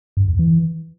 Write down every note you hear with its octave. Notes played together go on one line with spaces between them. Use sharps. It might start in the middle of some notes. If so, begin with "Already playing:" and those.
G2
E2
E3